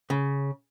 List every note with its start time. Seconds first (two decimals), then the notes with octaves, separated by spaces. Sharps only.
0.10 C#3